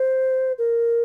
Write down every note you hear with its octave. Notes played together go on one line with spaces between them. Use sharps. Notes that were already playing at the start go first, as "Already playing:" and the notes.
Already playing: C5
A#4